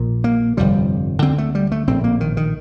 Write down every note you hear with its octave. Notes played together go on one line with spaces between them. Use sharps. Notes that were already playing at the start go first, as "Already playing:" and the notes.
Already playing: A#1 A#2
A#3
G1 F2 C3 G3
D2 D3 C4
A3
G3
A3
A#1 A2 C4
A#3
D#3
D#3